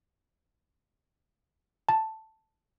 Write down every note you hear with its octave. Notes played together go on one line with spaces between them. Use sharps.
A5